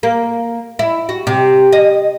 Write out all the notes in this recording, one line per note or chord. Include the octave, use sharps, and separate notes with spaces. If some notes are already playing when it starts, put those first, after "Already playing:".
A#3
E4
F#4
C3
D#5